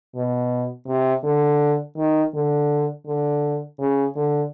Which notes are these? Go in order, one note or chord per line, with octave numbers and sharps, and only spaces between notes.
B2
C3
D3
D#3
D3
D3
C#3
D3